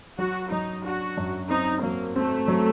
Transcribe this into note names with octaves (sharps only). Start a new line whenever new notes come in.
F#3 F#4
F#3 D#4
D4 F#4
F#2
C4 D#4
F#3 A#3
A3 C4
F#3